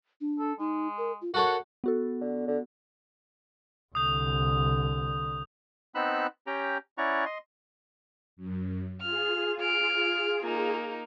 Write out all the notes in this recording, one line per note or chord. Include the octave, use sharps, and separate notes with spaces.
D4
A4
G#3 D#4
A#4
F4
F#4 A4 A#4 C#5 F#5
B3 F#4 A4
D3
D3
C2 D3 D#6 G6
B3 C4 D#4 B5 E6 F#6
C#4 G4 G5 A#5
C#4 E4 D5 F#5 A#5 C#6
D#5 C6
F#2
F4 G#4 F6
F6 D7
A#3 D#4